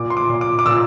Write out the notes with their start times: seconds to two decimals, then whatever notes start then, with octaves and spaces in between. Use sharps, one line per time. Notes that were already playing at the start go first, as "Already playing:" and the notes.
Already playing: A#2 D6
0.10 C6
0.17 D6
0.29 A#2
0.41 D6
0.59 D6
0.66 A#2 E6